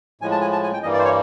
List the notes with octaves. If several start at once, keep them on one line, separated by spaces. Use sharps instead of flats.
A2 F3 G#3 G#5
A5
G#5
A5
G#5
G5
G2 E3 G3 A#3 D#5
D5
C5
C#5